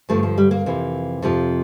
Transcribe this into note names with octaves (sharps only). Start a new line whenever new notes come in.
G2 D3 F3 A3
F3
G3
A#3
F2 C3 E3
F2 C3 F3